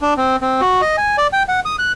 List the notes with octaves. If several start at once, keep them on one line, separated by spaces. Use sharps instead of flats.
D4
C4
C4
F#4
D#5
G#5
D5
G5
F#5
D#6
F#6